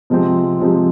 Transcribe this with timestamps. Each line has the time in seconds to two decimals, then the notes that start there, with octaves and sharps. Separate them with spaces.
0.10 C3 F3 G#3 C4
0.60 C3 F3 G#3 C4